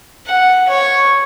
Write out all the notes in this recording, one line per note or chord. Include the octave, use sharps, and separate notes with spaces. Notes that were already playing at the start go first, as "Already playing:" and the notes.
F#5
C#5